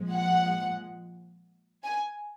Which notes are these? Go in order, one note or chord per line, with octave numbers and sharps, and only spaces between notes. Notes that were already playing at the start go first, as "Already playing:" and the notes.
Already playing: A#2 F3 G#3
F#5
G#5